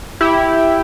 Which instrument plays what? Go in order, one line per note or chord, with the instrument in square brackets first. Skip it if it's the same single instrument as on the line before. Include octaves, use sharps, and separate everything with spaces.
[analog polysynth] E4 G4